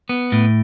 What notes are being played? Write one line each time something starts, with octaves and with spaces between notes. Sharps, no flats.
B3
A2